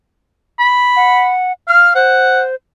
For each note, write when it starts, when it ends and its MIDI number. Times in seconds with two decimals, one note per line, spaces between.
0.59 1.30 83
0.96 1.52 78
1.68 1.94 77
1.68 1.92 89
1.95 2.55 72
1.95 2.42 78